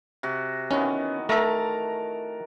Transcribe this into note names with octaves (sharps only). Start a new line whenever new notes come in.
C3 F#4
D#3 E3 B3 C#4
A3 A#4 E5 A5 A#5